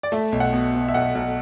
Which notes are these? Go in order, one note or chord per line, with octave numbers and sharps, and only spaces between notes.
D5
A3 E5
B1
F#5
B2
B2
E5
B1 F#5
B1